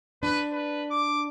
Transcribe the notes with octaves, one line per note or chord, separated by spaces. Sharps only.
D4 B4
B4
D6